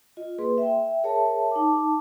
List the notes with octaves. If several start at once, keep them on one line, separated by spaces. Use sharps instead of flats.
F4 D#5
A#3 G#4 B4 C6
E5 G5
G#4 A#4 C#5 E5 A5
D#4 A5 D6